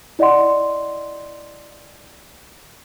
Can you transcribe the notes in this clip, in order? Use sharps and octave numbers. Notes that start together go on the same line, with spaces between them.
E4 D5 D#5 F#5 C6